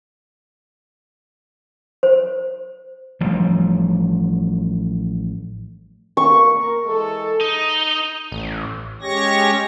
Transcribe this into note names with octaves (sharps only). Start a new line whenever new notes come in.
C5
A1 F3 G3
B2 A#3 C#6
A#4
E3 G#3 A4
D#4
A1
G#3 C#4 G4 C#5 C#6 A#6